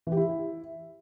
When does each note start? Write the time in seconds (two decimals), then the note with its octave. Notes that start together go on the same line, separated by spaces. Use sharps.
0.07 E3
0.12 G4
0.17 E4